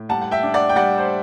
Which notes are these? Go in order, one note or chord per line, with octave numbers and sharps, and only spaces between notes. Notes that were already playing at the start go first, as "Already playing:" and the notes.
Already playing: A2
G3 F#5 A5
F#5
E5 G5
D4
D5 F#5
G5
G3 D5 F#5
C5